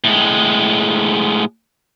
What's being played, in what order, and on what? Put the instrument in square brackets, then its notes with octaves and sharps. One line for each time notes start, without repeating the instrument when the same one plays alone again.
[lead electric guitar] A2 G#3